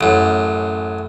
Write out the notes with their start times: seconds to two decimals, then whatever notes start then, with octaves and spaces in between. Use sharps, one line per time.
0.01 A1 F#2